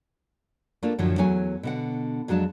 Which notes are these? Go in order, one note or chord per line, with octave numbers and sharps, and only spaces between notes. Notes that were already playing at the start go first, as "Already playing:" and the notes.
A3 A#3 D4 F4
F#2 A2 D3 F3 F#3
E2 F#3 A3 C#5 G#5
B2 D3 F#5
F2 F#3 G#3 D4 A5